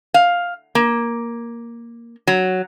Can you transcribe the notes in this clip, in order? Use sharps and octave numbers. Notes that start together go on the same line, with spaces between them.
F5
A#3
F#3